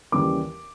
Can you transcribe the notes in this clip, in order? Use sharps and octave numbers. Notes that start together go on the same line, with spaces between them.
D#2 C#3 E3 G3 D6